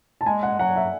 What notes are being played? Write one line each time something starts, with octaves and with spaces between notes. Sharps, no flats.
A5
G#3 G#5
F#5
F#3 F#5
E5